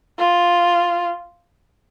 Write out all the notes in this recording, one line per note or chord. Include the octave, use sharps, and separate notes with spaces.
F4